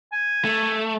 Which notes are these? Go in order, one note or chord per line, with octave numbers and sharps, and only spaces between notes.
G#5
A3